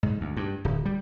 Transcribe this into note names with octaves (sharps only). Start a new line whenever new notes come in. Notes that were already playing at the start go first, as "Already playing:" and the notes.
G#2
D2
G2
D1
G3